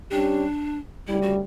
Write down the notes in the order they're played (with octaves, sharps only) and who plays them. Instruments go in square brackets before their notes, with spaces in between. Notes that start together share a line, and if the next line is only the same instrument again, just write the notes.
[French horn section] G3 C#4 G4 [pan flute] D4
[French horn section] D2 C#3 G3 [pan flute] E4
[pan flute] F#4